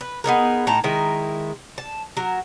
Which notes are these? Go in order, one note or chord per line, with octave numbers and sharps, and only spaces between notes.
B4
B3 D#4 G#4 A#4
A2 D#4 A5 A#5
D#3 G#3 E4 A#4
A5
F#3 A#4